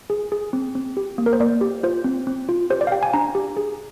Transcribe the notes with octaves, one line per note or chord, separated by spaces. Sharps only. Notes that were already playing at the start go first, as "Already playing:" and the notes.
G#4
G#4
C4
C4
G4
A#3
A#4
C5
A#3 D5
G4
F4 C5
C4
C4
F4
G4 C5
D5
F5
G4 G5
G#5
D4 A#5
G4
G#4